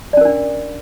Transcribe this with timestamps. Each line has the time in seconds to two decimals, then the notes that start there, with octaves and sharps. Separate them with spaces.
0.13 D5
0.17 C#4
0.21 A#4
0.25 D4